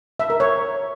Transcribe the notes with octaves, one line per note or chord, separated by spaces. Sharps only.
E5
A#4
C#5